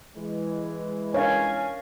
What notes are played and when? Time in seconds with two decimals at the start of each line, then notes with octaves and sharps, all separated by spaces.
0.16 E3 G#3
1.14 C#4 D4 A#4 C#5 F5 G#5